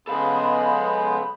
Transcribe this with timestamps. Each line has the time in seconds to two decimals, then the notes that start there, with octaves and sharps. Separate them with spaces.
0.07 C#3 G#3 B3 A4 F5 B5